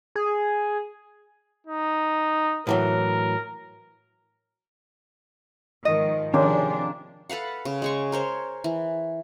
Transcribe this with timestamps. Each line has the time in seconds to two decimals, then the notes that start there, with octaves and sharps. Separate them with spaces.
0.15 G#4
1.67 D#4
2.67 A2 E3 F#3 A#4
5.85 G#2 D#3 F3 D#5
6.34 C3 D#3 F3 G#3 A#3 C#4 D4 G4
7.30 A4 B4 F5 F#5
7.65 C#3
7.82 G#3 G#4 C#6
8.12 A#4 C5 C#5
8.64 E3